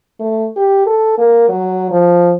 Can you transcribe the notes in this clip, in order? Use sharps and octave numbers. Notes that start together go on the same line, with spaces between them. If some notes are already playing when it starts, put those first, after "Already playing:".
A3
G4
A4
A#3
F#3
F3